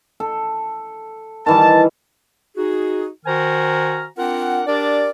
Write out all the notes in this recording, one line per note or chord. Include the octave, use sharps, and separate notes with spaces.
A4
D#3 E3 G3 A5
D#4 F#4 G#4
D#3 F#4 C5 G#5 A#5 F6
C4 D4 F4 A#4 F#5
D4 G4 A#4 D5